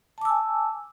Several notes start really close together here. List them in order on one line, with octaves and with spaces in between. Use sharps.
A5 D6 E6 G#5